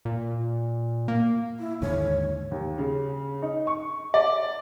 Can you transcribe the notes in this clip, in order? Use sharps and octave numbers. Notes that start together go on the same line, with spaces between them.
A#2
A#3
E4
D#2 G#2 D3 C#5
D#2
C#3
D#4
C#6
D5